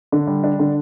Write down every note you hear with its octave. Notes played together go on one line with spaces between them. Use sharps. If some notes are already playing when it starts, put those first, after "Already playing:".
D3
G3
D4
D3